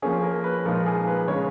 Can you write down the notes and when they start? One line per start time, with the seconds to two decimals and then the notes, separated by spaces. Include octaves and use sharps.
0.02 F3 A#3 C#4 G#4
0.23 A#4
0.44 B4
0.65 A#2 F3 G#3 D#4 A#4
0.86 G#4
1.07 B4
1.28 C#3 G#3 C#4 C#5